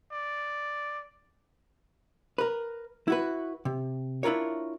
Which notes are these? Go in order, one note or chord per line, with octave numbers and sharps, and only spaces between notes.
D5
A#4 B4
E4 F#4 B4
C3
D4 E4 F4 A#4 C#5